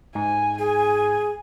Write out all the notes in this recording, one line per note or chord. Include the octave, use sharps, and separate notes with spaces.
G#2 G#5
G#4 G#5